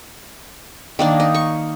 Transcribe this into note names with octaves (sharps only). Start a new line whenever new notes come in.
D#3 A#3 D4
D#4
C#6